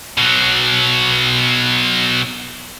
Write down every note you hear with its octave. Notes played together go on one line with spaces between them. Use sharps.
B2 F#3